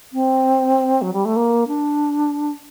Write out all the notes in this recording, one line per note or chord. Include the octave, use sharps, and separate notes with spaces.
C4
F#3
G3
A3
A#3
D4